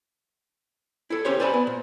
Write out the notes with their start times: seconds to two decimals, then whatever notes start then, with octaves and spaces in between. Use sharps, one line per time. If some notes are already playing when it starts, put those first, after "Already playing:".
1.10 E4 A4
1.25 C4 C#4 G4 C5 C#5
1.40 B4 C5 D5 G#5 A5 B5
1.53 B3
1.67 A#2